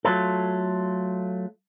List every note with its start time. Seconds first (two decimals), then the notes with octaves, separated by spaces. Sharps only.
0.05 F#3 A3 F4 A4